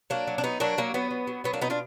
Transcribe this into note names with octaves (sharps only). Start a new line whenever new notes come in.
F#3 A#3 D4
F#3
D4
F#3 B3 D#4
F#3 A#3 D4
F#3 A#3
F#3 B3
F#3
F#3
F#3 B3
A#3 D4
B2 B3 D#4
D4 F4